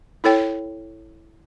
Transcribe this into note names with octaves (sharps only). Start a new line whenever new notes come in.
E4 A4 C#5 G5